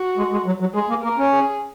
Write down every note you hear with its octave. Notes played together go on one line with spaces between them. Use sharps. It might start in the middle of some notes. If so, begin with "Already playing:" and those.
Already playing: F#4
G#3
G#3
F#3
F#3
G#3 G#4
A#3
A#3 A#4
C#4
G#4